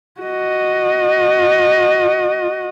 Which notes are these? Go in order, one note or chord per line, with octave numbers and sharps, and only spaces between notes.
F#4 D#5